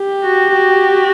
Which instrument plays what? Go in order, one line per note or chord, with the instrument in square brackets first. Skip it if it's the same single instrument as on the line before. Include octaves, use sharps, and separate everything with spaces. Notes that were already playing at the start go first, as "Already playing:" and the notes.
Already playing: [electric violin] G4
[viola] F#4
F#4